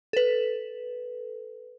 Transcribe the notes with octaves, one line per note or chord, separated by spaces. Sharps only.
A4 B4